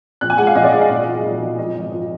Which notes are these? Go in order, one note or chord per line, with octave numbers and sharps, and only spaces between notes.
A#1 F#6
G#5
G#3 F#5
F5
A#1 D#5
D5
G#3 D#5
F5
A#2 D#5
B1
B1
B1
F3 D#5
G#1
F3